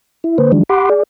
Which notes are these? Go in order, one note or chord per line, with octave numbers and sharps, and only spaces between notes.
E4
D3 A#3 B4 C5
D#3 F3 F#3 G#3 D4
G4 F#5 B5 C6 D6
G#4 D5